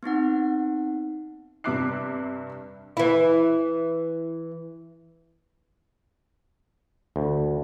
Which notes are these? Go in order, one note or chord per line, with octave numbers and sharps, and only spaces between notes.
B3 C4 D#4 F#5
G2 C3 E5 D6 F#6 C7
E3 E4
D2